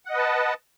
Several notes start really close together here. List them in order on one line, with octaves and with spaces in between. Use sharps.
F#5 D#5 B4 A5